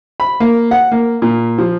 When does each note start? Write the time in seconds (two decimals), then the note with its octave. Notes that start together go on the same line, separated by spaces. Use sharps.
0.20 B5
0.40 A#3
0.71 F#5
0.92 A#3
1.22 A#2
1.58 F3